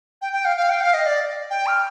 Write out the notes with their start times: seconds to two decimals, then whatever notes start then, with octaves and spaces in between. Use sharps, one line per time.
0.22 G5
0.33 G5
0.45 F5
0.57 F5
0.70 G5
0.81 F5
0.94 D#5
1.06 D5
1.50 G5
1.67 F6